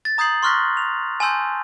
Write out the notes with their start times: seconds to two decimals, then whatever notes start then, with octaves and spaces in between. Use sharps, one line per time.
0.05 A6
0.18 A#5 D#6 G6 G#6 C7 F#7
0.43 C6 C#6 F6 F#6 A#6 B6
0.77 F7
1.20 G#5 A5 C6 E6 G6